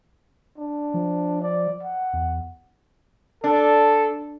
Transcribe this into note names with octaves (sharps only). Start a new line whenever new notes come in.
D4
F3
D5
F#5
E2
D4 A4